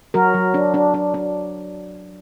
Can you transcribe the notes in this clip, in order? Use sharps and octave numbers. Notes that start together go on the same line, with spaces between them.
F#3 F#4 A#4
F#3
D4
D4
D4
D4